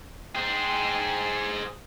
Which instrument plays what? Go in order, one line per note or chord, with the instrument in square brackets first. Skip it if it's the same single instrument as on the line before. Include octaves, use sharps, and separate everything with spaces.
[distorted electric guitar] G#4 C5 [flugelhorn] G5